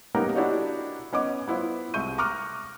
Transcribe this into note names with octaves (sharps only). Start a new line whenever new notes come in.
A#3 B3 C#4 D#4 G4 A#4
D4 E4 F#4 G4 C#5 D#5
B3 C#4 D#5 D6
B3 E4 F4 C5
C2 G#3 E5 C#6 G6 D#7
A#5 C#6 D6 F6 F#6 A#6